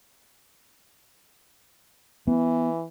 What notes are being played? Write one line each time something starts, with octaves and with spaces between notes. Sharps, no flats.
E3 B3